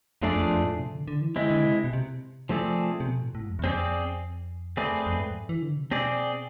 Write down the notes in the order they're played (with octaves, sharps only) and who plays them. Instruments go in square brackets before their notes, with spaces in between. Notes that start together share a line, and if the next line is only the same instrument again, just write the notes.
[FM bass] F2 [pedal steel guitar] F3 A3 D4 G#4 D5
[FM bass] F2
F2
A2
C3
D3
D3
E3
[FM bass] D3 [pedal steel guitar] G#3 C4 E4
[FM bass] D3
C3
B2
C3
[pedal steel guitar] F3 A3 C4 G#4 D5
[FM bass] C3
B2
A2
A2
G#2
F2
E2
[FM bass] F2 [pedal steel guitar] C4 G#4 D5
[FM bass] E2 [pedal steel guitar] A3 C4 G#4 B4 D5
[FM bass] F2
F2
G#2
E3
D3
C3
[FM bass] B2 [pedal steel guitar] C4 G#4 D5